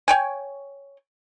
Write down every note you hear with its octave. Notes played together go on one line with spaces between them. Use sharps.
C#5 G5 G#5